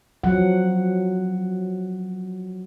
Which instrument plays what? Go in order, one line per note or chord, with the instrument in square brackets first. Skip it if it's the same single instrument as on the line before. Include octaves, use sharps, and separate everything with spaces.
[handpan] F3 F#3 F#5